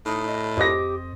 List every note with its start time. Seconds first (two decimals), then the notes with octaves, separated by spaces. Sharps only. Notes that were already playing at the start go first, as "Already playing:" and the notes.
0.06 A2 D#4
0.28 D#5
0.57 F2 G4 C5 D#5 A#6